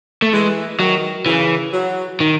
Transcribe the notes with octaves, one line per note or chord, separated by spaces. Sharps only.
A3
E3 G#3
D#3 F#3
C#3 E3
F#3
D#3